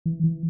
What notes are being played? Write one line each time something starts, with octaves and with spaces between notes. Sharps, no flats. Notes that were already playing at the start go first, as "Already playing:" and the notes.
E3
E3